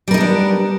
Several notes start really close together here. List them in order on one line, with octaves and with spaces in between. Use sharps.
G3 A#4 D#4 D4 B3